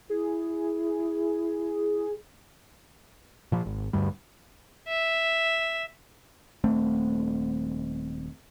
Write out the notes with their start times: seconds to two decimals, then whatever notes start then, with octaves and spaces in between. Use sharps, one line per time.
0.10 E4 G#4
3.52 A#2 F3
3.66 G#1
3.93 D2 G2 G3
4.88 E5
6.64 D#1 A3 C4